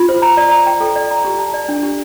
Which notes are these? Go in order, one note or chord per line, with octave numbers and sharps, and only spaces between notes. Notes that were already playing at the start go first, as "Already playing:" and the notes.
Already playing: F4
C5
A#5
D5
A#5
G5
A4
D5
A#5
G4
A5
D5
D4
G4